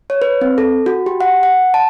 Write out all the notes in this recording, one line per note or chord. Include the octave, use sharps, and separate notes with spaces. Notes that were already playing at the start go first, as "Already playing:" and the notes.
C#5
B4
C4
A4
F#4
G4
F#5
F#5
A5